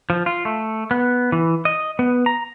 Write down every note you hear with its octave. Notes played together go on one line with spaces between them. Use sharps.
F3
F4
A3
B3
E3
D#5
B3
A#5